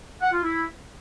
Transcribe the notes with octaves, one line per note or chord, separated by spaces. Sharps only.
F#5
F4
E4